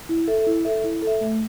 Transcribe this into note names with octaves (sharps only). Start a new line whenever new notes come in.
E4
A4 E5
E4
A4 E5
E4
A4
E5
A3